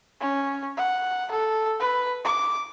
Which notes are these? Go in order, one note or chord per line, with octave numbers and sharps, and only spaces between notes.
C#4
F#5
A4
B4
D6